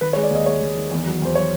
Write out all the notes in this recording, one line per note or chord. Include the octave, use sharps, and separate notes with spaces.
D#3 B4
C#5
G#3
D5
D#2 D#5
G#3 C#5
D#2
D#3
E2
F#3
E2 C5
F#3 C#5